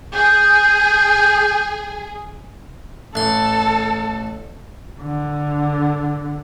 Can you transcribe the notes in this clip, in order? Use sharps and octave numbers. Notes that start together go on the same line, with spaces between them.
G#4 G6
A1 A4 C6
D3